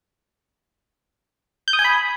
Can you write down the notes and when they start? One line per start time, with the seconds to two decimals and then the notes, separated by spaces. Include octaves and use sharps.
1.68 G6
1.73 D#6
1.79 G#5
1.85 B5